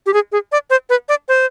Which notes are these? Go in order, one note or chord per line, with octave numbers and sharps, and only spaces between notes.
G4
G#4
G#4
D5
C5
B4
D5
C5